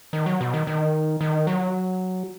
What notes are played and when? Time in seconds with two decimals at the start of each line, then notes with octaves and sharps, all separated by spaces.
0.13 D#3
0.26 F#3
0.41 B2
0.54 D#3
0.67 D#3
1.21 D#3
1.47 F#3